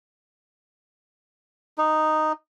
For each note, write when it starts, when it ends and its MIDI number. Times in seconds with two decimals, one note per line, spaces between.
1.78 2.32 63